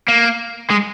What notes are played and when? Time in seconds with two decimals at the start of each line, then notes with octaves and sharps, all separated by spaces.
0.08 A#3
0.70 G#3